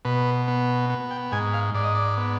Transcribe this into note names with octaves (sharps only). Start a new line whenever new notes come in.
B2 B4
B3
B3
G5
G#2 G#5
F5
G#2 D5
D#5
D5
B3